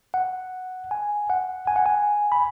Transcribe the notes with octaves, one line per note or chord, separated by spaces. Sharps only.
F#5
G#5
F#5
G#5
F#5
G#5
B5